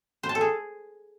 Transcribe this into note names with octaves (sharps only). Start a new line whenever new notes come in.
C5
A5
A4
G#4